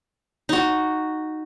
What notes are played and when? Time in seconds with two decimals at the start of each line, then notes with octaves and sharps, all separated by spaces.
0.49 D#4 F#4